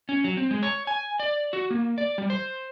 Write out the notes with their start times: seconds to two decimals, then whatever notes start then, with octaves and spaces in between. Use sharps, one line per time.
0.09 C#4
0.24 F#3
0.37 C4
0.51 G#3
0.63 C#5
0.87 G#5
1.20 D5
1.53 F#4
1.71 A#3
1.98 D5
2.18 G3
2.30 C5